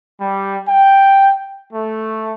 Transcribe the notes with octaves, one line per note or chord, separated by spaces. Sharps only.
G3
G5
A3